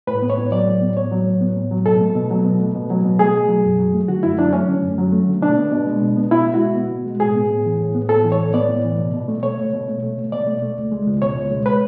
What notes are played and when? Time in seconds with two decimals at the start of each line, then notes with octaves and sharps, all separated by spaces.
0.07 A2 B4
0.22 B3
0.30 C#5
0.37 A2
0.52 F#3 D5
0.67 A2
0.82 B3
0.97 A2 C#5
1.11 F#3
1.26 A2
1.41 B3
1.56 A2
1.71 F#3
1.86 B2 A4
2.00 A3
2.15 B2
2.31 F#3
2.45 B2
2.60 A3
2.74 B2
2.90 F#3
3.04 B2
3.19 A3 G#4
3.34 B2
3.49 F#3
3.64 F#2
3.79 F#3
3.93 A3
4.08 D3 F#4
4.23 F#2 E4
4.38 F#3 D4
4.53 A3 C#4
4.68 D3
4.83 F#2
4.98 F#3
5.12 A3
5.27 D3
5.42 B2 D4
5.57 B3
5.72 B2
5.87 G#3
6.02 B2
6.17 B3
6.31 B2 E4
6.46 G#3
6.54 F#4
6.60 B2
6.76 B3
6.90 B2
7.06 G#3
7.20 A2 G#4
7.35 B3
7.50 A2
7.65 E3
7.80 A2
7.95 B3
8.09 A2 A4
8.24 E3
8.32 C#5
8.39 A2
8.54 B3 D5
8.69 A2
8.84 E3
8.99 B2
9.14 B2
9.28 A3
9.43 A3 C#5
9.58 B2
9.73 B2
9.88 A3
10.03 A3
10.18 B2
10.32 B2 D5
10.47 A3
10.62 A3
10.77 C#2
10.92 G#3
11.07 C#2
11.22 B2 C#5
11.36 C#2
11.51 G#3
11.66 B4